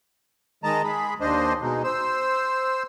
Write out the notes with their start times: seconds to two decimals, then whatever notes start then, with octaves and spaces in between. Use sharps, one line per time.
0.64 D#3 G#3 D#5 A5 A#5
0.84 G#3 G#4 B5
1.21 D#2 D4 C5 D#5
1.62 B2 G#3 D#4
1.84 C5 E6